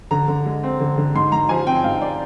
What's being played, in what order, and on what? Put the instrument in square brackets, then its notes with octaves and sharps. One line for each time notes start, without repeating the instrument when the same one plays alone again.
[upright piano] D3 A#5
D3
G#3
C4
D3
D3
G#2 C6
G#2 A#5
F3 G#5
C4 G5
G#2 F5
D5